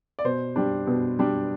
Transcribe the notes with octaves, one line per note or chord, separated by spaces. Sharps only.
D5
B2 C5
G3 D4
B2
G3 D4